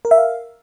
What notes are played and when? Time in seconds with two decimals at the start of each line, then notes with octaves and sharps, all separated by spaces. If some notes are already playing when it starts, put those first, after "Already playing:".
0.05 A#4
0.11 E5
0.18 F5